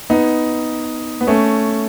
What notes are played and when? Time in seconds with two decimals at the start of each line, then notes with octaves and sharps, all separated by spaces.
0.10 B3 D#4
1.21 B3
1.27 A3 C#4